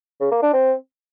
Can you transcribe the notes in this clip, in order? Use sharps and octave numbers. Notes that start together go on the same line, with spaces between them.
C#3
A#3
D4
C4